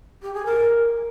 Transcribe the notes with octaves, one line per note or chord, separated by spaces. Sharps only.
G4
G#4
A#4